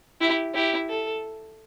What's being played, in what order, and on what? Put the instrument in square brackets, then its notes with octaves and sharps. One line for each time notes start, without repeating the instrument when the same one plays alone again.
[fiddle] E4 [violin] G4
[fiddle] E4 [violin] G4
[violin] A4